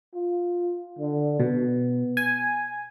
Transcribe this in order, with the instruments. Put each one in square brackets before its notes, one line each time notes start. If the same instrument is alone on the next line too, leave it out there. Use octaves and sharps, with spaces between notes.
[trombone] F4
D3
[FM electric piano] B2 [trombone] B3
[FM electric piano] G#5